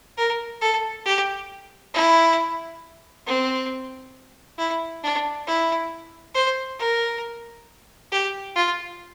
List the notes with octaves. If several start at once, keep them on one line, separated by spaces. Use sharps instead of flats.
A#4
A4
G4
E4
C4
E4
D4
E4
C5
A#4
G4
F4